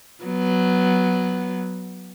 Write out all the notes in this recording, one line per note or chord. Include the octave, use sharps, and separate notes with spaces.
F#3 B3